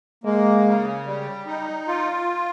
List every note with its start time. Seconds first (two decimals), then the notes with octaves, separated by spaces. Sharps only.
0.24 G#3 A#3
0.65 C#3
1.05 G3
1.47 D#4
1.88 F4